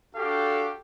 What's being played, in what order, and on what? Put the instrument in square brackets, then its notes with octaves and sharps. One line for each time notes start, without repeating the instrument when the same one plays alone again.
[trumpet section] D4 F#4 G4 A4 F5